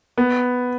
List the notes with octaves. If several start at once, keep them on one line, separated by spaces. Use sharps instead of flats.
B3